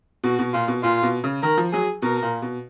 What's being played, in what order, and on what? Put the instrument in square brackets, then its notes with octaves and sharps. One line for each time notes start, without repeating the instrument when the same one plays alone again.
[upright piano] B2 [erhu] F#4
[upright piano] B2
[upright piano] A#2 [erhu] F4
[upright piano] B2
[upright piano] A#2 [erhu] F4
[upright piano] B2
C#3
[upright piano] D#3 [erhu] A#4
[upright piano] F3
[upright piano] F#3 [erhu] G#4
[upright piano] B2 [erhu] A#4
[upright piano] A#2
B2